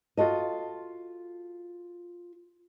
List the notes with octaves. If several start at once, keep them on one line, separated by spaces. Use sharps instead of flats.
F4 F#4 A4 D#5